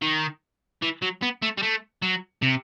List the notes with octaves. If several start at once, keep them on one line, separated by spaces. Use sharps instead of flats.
D#3
E3
F#3
B3
A3
G3
A3
F#3
C3